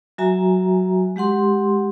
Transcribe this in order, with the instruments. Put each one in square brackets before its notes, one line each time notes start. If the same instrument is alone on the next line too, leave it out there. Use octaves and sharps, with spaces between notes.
[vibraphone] F#3 F#4 E5 G#5 A#5
G#3 G4 F#5 C6